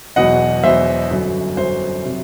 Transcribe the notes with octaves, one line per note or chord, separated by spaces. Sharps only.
E1 E2 B2 F#3 D#5 F#5
E1 E2 B2 F#3 C5 E5
G1 F#2 F#3
G1 F#2 F#3 C5
C3 F#3